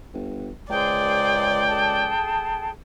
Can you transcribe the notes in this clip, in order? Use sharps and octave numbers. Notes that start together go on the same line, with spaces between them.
G1
C#2 G#4 C5 D5 G5
G#4 A4 A5